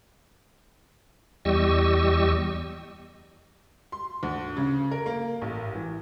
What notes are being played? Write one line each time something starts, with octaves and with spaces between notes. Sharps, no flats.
E2 G3 G4 D#5 C#6 E6
C6
D2
C#3
A#4
A#3
A1
E3